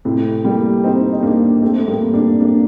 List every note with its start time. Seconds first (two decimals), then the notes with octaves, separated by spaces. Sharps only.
0.05 A2 C3
0.44 G3 A#3
0.83 C4 D#4
1.13 D#4
1.23 A#3 D4
1.62 A3 C4
1.88 G3 A#3
2.14 A#3 D4
2.40 A#3 D4